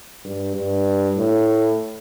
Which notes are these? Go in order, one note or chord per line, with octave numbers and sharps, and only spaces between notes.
G2
G2
A2